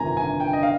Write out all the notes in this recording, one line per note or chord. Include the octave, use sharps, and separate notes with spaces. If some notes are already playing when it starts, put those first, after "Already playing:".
Already playing: G1 F2 C3 D#3 G#5 A#5
G#5
G5
D#5
F5